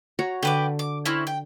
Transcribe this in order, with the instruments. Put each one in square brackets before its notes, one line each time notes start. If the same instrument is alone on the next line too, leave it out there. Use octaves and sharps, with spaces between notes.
[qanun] F#4 C#5 A#5
[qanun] D3 [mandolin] G4 B4 D6
[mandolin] D6
C4 C#4 E4
G5